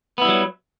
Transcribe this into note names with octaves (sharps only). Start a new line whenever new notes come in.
F#3 G3 B3 E4